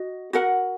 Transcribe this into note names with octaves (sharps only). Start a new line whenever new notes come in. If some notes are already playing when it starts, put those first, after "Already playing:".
Already playing: F#4 D#5
F#4 A#4 F#5